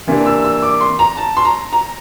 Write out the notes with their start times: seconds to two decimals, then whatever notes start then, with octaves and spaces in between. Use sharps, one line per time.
0.07 C3 E3 A#3 D4
0.26 E6
0.44 E6
0.62 D6
0.81 C6
0.99 A#5
1.17 A5
1.37 C6
1.45 A#5
1.72 A#5